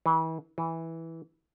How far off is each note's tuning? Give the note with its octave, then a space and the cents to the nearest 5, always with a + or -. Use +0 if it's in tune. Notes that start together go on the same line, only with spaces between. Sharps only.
E3 -35
E3 -10